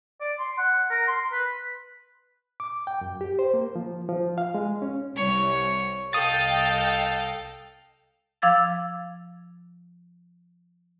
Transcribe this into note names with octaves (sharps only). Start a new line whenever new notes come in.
D5
C6
F#5
A#4
C6
B4
D6
G5
F#2
G4
C5
A#3
F3
F3
F5
G#3
C#4
C2 C#5
C2 A4 D#5 F5 G5 D#6 A6
F3 F5 D6 E6 G#6 A6